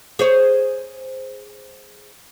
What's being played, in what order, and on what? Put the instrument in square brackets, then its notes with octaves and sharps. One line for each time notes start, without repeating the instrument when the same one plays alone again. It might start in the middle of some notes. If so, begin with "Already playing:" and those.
[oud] G#4 C5 C#5